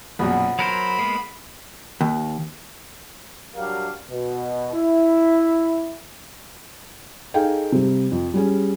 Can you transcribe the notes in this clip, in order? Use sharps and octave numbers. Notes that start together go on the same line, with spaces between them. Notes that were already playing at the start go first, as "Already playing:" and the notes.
A#1 F#2 B2 B3
F#3 A#4 C5 B5 C#7
G#3 A#3 B3
D#2
F#3 G3 D4 A#4 F5
B2
E4
D#4 G#4 A4 F5 G5
C3 G3
F2
G3 C#4 G#4